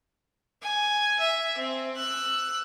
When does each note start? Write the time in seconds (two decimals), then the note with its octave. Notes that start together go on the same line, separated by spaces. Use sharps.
0.62 G#5
1.19 E5
1.58 C4
1.96 E6 F#6